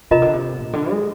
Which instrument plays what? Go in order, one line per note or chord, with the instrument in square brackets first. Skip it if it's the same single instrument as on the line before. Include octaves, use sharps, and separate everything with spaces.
[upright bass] C3 [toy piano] F4 A#4 D#5 A#5
[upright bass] D3
C3
A#2
D3
G#3